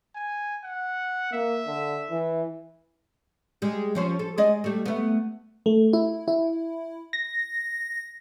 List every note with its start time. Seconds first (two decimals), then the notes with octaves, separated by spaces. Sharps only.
0.15 G#5
0.64 F#5
1.32 A#3 E5
1.66 D3
2.10 E3
3.62 G3 G#3
3.95 F3 C#4 C5
4.19 A4
4.38 G#3 D5 D#5
4.64 G3 A3
4.85 A3 B3
5.66 A3
5.93 E4
6.28 E4
7.13 A#6